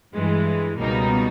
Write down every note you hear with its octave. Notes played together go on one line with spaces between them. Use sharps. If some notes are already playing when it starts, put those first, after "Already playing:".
G2 E3 G#3
C#2 B2 G3 A#3 D#4